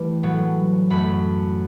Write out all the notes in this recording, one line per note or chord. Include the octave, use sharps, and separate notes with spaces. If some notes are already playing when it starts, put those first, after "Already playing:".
Already playing: E3 G3 A3
A2 F#3 B3
F#2 F#3 A3 B5